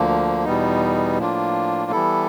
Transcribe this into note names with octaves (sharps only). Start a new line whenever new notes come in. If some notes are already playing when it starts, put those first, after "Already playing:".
Already playing: D2 D3 F3 A#3
E2 B2 G3 B3 D#4
A2 F3 A#3 D4 F4
E3 G3 B3 E4 A4